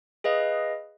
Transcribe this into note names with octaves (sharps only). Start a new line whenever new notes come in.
G#4 B4 D#5 F5